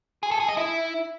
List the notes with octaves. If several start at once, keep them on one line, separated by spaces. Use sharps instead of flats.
G#4
A4
G#4
D#5
E4